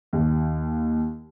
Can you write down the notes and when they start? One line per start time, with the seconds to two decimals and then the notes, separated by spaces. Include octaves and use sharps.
0.13 D#2